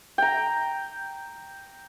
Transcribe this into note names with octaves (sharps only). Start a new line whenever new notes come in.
G5 A#5